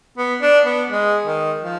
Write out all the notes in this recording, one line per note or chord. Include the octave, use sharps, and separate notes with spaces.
B3
D4
B3
G#3
D#3
F3